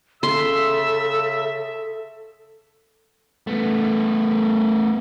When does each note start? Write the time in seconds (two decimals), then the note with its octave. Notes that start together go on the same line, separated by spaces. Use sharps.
0.23 C#3 A4 E5 C6 E6
3.47 A3 B3